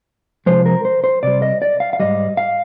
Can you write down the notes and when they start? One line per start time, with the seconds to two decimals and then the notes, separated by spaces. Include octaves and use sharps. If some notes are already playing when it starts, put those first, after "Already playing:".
0.46 C3 F3 G#3 C5
0.66 A#4
0.85 C5
1.04 C5
1.23 C3 G3 D5
1.42 D#5
1.62 D5
1.80 F5
1.93 F5
2.00 G#2 D#3 G3 D#5
2.37 F5